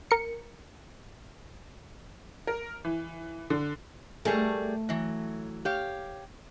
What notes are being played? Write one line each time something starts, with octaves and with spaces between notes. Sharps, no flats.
A#4 C#7
A#4
E3
D3
G3 A3 G#4 A#4
E3 F#3
G4 C#5 F5